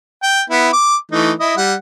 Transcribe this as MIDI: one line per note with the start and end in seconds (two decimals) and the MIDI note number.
0.23 0.42 79
0.50 0.69 59
0.50 0.69 64
0.73 0.96 86
1.12 1.32 52
1.12 1.32 57
1.12 1.32 63
1.40 1.55 64
1.40 1.55 75
1.57 1.74 55
1.57 1.74 78